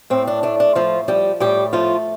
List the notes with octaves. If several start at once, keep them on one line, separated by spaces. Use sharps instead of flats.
A2 C4
D4
A3 D4
D4
A2 F3 F4
F3 G3 G4
A2 G3 G4
F3 A3 F4